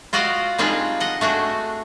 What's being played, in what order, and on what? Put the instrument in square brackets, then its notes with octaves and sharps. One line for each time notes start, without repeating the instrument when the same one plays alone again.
[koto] F4 F#4 D5 D#5 F5
G3 C4 D4 D#4 F4 G#4
D#5 F#5
A3 D4 F#4 G#4